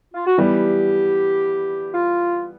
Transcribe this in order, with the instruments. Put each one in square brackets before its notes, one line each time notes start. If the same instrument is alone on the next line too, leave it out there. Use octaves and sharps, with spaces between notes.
[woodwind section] F4
F#4
[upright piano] E3 G3 B3 [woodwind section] G4
[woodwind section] F4